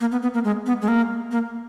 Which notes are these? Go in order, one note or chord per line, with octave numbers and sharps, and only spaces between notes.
A#3
B3
B3
A#3
G#3
B3
G#3
A#3
A#3